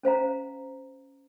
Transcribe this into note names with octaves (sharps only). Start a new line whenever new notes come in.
C#4 C5 F5 A#5